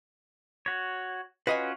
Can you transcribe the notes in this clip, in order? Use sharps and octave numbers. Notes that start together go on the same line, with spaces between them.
F#4 C#5
C#4 F4 F#4 B4 D#5 G#5